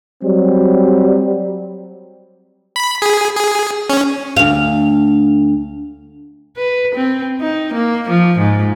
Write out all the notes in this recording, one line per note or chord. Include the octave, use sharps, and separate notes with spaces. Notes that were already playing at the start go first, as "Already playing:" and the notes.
F#3 G3 C4
B5
G#4
G#4
C#4
D2 F5
B4
C4
D#4
A#3
F3
G#2